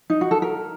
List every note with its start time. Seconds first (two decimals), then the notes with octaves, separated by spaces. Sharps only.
0.10 D#4
0.21 F#4
0.31 A4
0.42 A#4